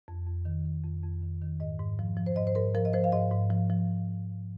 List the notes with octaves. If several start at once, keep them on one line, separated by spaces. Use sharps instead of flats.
F2
F2
D#3
D#3
F2
F2
D#3
D#3
G#2 D#5
G#2
F3
F3
C5
G#2 D#5
C5
G#2 A#4
F3 A#4
D#5
F3 C5
F5
G#2 D#5
G#2
F3
F3